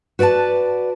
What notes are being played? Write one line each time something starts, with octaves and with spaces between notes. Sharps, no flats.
F#4 B4 D5 E5 A5